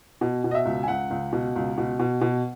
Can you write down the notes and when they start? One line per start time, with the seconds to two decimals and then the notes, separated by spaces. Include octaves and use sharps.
0.21 B2
0.44 B2
0.51 D#5
0.55 E5
0.65 C#2
0.83 G#5
0.88 C#2 F#5
1.10 C#2
1.33 B2
1.55 C#2
1.78 B2
1.99 B2
2.21 B2